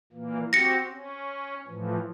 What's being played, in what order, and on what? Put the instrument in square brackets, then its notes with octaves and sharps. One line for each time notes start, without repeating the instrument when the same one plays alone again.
[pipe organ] A#2 E3 A#3
[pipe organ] C4 F#4 G4 [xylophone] A#6 C#7
[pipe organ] C#4
A2 E3 F3